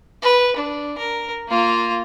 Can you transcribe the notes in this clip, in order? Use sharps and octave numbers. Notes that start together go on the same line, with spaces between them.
B4
D4
A#4
A#3 F4